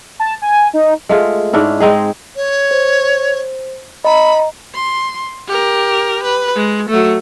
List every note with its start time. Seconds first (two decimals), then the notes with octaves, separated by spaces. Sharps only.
0.20 A5
0.42 G#5
0.74 D#4
1.09 G#3 A3 F4 G#4
1.53 G#2 C#4 D4 E4
1.80 G#3 C4 D#4 G#4
2.36 C#5
2.71 C5
4.05 D#5 A#5 B5
4.74 C6
5.47 G4 A#4
6.23 B4
6.55 G#3
6.89 F#3 A3